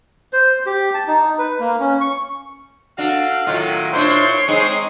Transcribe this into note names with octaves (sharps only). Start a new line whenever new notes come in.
C5
G4
A5
D#4
B4
A#3
C#4
C#6
D4 F#4 A4 F5
A2 D#3 F#3 F4
A#2 D4 E4 C5 C#5 C6
G#3 C4 D#4 G#4